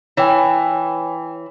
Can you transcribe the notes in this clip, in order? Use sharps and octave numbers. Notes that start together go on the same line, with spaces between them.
E3 C#5 G5 G#5